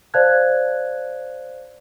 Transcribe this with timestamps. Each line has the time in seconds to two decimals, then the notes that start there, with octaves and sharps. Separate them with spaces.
0.14 C5 D5 F5 A5 F#6 G#6